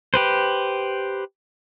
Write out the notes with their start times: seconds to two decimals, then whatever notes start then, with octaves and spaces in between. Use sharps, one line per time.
0.14 G4 B4 C5